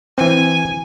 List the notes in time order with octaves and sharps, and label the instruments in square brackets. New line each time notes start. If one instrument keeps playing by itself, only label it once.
[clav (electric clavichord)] E3 C4 [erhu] G#5